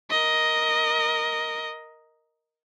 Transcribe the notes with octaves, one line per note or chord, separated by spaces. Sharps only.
A#4 D#5